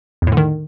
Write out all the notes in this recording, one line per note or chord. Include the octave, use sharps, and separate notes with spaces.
E2
A2
D3
D#3